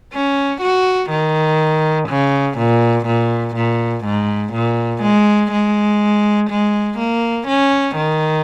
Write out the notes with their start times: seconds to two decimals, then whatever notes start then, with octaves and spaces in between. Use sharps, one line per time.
0.13 C#4
0.62 F#4
1.10 D#3
2.08 C#3
2.58 A#2
3.06 A#2
3.55 A#2
4.04 G#2
4.53 A#2
5.02 G#3
5.52 G#3
6.50 G#3
6.98 A#3
7.48 C#4
7.96 D#3